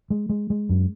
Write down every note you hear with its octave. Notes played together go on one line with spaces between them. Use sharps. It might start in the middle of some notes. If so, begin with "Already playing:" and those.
G#3
G#3
G#3
F#2